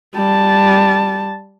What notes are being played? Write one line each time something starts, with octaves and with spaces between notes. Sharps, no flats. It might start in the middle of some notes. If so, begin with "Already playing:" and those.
G3 A5